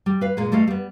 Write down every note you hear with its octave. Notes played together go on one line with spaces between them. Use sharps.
G3
B4 F5
A#2 G#3
G3 A3 D#5 F5
G3 B3